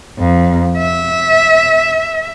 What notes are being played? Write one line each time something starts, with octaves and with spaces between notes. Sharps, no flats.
F2
E5